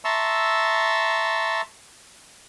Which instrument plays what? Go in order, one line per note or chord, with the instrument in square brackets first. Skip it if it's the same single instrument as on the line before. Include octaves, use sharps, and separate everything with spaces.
[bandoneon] E5 A5 A#5 C6 C#6 E6